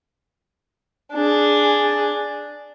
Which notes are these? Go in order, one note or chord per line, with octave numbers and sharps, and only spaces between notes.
D4 G#4